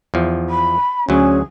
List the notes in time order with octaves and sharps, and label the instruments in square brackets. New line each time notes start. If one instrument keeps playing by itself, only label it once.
[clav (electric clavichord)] E2 F3
[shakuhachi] B5
[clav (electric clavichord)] D2 F#3 [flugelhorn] C#4 [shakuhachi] G#4